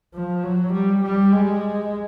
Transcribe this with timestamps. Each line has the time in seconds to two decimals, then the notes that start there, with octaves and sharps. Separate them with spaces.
0.15 F3
0.44 F#3
0.73 G3
1.04 G3
1.32 G#3